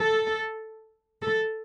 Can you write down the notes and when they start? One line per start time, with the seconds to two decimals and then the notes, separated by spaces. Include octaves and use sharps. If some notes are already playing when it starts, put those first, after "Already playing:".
Already playing: A4
1.22 A4